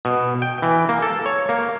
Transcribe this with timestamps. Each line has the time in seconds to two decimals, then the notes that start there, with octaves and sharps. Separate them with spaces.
0.05 B2
0.42 G5
0.62 E3
0.89 A#3
1.02 A4
1.26 C#5
1.49 A#3